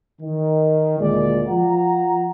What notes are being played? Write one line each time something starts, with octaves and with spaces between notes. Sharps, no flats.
D#3
D2 A#2 G#3 D5
F3 F4 F#5 A#5